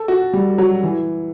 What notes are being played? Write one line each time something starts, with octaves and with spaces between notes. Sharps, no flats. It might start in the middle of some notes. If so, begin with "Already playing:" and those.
Already playing: A4
F#4
G3
F#3
E3